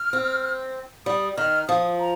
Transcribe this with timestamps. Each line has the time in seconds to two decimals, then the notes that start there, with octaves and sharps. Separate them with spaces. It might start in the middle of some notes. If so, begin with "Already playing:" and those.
Already playing: F6
0.13 C4
1.06 G3 D#6
1.37 D#3 F6
1.68 F3 D#6
2.00 A#5